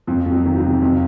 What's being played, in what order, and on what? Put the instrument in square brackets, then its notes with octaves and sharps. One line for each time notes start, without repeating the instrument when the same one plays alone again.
[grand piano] F2 [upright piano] F3
[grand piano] F2
[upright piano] F#3
[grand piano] D#3
[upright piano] F#3
[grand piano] C3
[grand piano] F2 [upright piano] F3